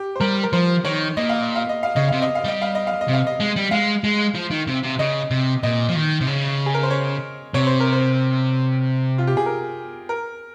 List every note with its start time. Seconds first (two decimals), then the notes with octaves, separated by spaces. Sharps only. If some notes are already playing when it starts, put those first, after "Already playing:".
Already playing: G4
0.16 C5
0.20 G3 A#4
0.43 A#4
0.53 F3 C5
0.85 D#3 C#5
1.17 A#2 D#5
1.29 F5
1.42 D#5
1.56 F5
1.69 D#5
1.83 F5
1.96 C#3 D#5
2.08 C3 F5
2.22 D#5
2.35 F5
2.44 G3 D#5
2.62 F5
2.75 D#5
2.87 F5
3.01 D#5
3.08 C3
3.14 F5
3.27 D#5
3.40 G#3
3.56 G3
3.71 G#3 F5
4.04 G#3
4.35 F3
4.51 D#3
4.68 C3
4.83 C3
4.99 C#3 D#5
5.31 C3
5.63 A#2 D#5
5.89 F3
5.95 D#3
6.21 C3
6.27 C#3
6.66 G#4
6.74 A#4
6.83 C5
6.90 C#5
7.54 C3 C#5
7.67 C5
7.80 A#4
7.92 C5
9.18 F4
9.27 G4
9.37 G#4
9.46 A#4
10.09 A#4